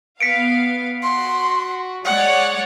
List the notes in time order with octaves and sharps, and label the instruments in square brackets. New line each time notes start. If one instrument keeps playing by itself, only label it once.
[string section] B3 F5 [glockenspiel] B6 C#7 D7
[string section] F#4 [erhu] C6
[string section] G#3 C#5 D5 [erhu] F#5